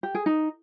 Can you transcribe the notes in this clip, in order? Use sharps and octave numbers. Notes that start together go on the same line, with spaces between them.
G4
G#4
D#4